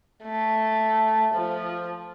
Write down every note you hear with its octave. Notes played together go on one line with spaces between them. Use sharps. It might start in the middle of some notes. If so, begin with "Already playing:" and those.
A3
F3